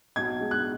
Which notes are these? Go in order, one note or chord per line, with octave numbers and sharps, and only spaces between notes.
B1 G#6
G#3
F#6